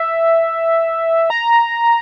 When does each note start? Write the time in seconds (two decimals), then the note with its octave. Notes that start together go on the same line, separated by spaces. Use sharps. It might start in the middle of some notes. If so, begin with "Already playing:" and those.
Already playing: E5
1.30 A#5